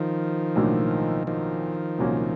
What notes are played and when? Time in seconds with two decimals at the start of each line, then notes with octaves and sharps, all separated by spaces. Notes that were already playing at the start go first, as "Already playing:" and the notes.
Already playing: D#3 F3
0.56 B1 A2 F#3 A#3 D4
1.27 D#3 F3
1.98 C2 A#2 F#3 A#3 C#4